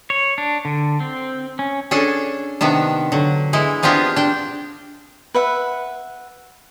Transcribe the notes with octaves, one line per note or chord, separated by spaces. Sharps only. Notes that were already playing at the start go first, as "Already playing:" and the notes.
C#5
D4
D3
C4
C#4
C#4 D4 G#4 A4
C3 D#3 B3 D4
D3 F#3
E3 G#3 E4
B3 C4 D4 F4 G4 G#4
D4 G5
B4 E5 F#5